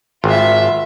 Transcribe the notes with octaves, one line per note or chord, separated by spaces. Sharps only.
G#1 F4 E5